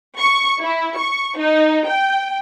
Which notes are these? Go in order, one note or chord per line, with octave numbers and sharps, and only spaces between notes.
C#6
E4
C#6
D#4
G5